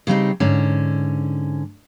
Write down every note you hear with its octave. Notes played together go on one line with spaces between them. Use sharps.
C#3 G3 C4 D#4
G#2 D3 C#4